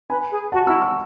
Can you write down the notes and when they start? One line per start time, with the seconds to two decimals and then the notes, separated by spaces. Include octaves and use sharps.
0.10 B4 G#5 B5
0.31 G#4
0.52 F#4 F#5 A5
0.67 E4 C#6 E6
0.81 C#6 E6